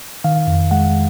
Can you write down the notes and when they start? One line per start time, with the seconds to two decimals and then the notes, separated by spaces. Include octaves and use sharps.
0.24 D#3 F5
0.47 F2
0.71 G#3 F#5